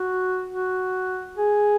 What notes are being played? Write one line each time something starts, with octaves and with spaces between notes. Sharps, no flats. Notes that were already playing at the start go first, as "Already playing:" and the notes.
Already playing: F#4
F#4
G#4